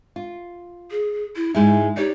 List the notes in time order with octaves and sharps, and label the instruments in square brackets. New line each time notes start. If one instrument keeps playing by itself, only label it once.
[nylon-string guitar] F4
[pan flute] G#4
E4
[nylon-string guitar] G#2 G#3 E4 [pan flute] D#4
[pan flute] D#4 [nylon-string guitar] G4 C#5 D5